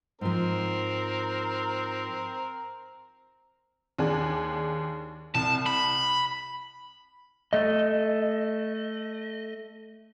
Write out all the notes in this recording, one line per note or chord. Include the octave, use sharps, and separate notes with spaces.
G#2 F3 C4 A#4
D#2 D4 G#4
C2 A5
B5
A3 D#5